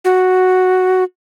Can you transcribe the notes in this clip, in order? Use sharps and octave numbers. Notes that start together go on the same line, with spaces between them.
F#4